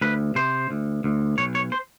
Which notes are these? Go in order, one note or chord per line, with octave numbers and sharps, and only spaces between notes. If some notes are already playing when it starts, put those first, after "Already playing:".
D2 B4
C3 C5
D2
D2
B1 C#5
C#5
C5